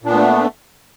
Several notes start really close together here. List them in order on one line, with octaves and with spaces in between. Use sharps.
A#2 D4 B3 A3